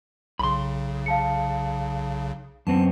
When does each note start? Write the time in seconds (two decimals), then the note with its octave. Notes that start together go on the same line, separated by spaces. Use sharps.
0.39 B1 C#3 B5 C6
1.06 F5 A5 C#7
2.67 F#2 B3 C4 A5